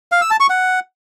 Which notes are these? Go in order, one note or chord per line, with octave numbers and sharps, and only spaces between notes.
F5
E6
A5
C#6
F#5